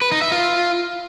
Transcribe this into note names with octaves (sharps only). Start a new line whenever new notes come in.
B4
D#4
E5
F4